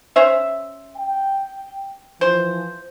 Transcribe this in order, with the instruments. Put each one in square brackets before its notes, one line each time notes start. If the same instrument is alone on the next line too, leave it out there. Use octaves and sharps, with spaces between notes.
[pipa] C#4 C5 E5
[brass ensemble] G5
[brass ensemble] E3 F3 [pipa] C5